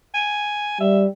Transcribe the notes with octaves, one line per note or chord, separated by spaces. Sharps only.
G#5
G3 E5